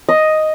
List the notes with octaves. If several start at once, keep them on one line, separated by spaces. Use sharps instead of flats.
D#5